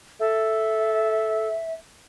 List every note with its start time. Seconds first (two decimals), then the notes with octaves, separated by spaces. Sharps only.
0.20 A4 E5